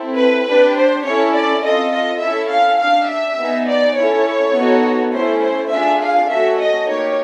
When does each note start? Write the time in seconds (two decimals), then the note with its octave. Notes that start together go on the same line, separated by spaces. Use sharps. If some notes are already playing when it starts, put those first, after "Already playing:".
Already playing: C4 E4 A4
0.18 B4
0.47 D4 G4 B4
0.76 C5
1.06 C#4 E4 A4 C#5
1.35 D5
1.63 C4 F4 A4 D#5
1.93 D#5
2.22 C#4 E4 A4 E5
2.51 F5
2.80 D4 G4 F5
3.09 E5
3.39 B3 D#4 G#4
3.68 D5
3.96 C#4 E4 A4 C#5
4.55 B3 D#4 F#4 A4
5.14 A3 C#4 E4 C5
5.42 C5
5.71 D4 F4 G#4 E5
6.01 F5
6.29 A3 C#4 F#4 A4 E5
6.59 D#5
6.88 A#3 D#4 G4 C#5